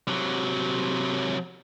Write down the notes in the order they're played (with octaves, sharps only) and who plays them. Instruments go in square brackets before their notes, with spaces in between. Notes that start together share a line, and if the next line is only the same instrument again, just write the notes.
[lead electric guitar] C3 F#3